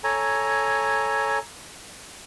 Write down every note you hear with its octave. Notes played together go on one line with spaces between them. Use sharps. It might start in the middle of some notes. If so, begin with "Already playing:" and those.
A4 C#5 G#5 A#5